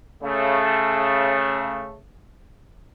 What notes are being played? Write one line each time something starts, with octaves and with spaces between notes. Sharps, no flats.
C#3 A3